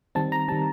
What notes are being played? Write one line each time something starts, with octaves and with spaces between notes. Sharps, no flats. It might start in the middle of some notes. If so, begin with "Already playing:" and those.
D#3 G3 C4 A5
A#5
D#3 G3 C4 A5